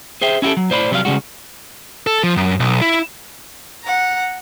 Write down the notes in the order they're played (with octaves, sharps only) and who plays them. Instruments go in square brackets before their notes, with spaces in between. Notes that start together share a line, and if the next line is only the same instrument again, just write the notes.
[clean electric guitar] G#4 C5 E5 G5
C#4 E4 F#4 G4 A4
F#3
A2 C5 D5 B5
C3 F#3 G3 D5 F5
C#3 G3 G#3 F#4
[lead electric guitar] A4
F3
F#2
B1
E4
[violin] F#5 A#5